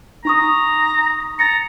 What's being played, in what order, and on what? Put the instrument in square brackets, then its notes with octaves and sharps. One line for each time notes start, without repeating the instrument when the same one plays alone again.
[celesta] D#4 C#6 D#6 [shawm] A#5
[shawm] A#5 [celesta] A6 A#6 C#7